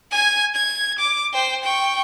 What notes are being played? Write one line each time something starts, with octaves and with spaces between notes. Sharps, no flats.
G#5 G#6
G#6
D6
C5 G5
G5 C#6